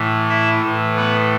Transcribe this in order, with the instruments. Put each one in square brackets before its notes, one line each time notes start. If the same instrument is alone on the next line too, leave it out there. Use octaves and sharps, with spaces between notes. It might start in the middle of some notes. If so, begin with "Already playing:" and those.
Already playing: [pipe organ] A2 E3
E4 E5
A2 E3
B3 B4